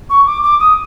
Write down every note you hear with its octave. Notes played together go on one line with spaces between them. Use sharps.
C#6
D6
D6
D#6